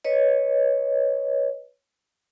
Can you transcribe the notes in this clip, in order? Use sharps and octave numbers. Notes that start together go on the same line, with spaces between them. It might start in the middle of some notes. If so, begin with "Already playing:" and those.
B4 C#5 D#5